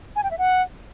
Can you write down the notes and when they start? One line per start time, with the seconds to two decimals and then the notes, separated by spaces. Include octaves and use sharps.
0.16 G#5
0.23 G5
0.31 E5
0.38 F#5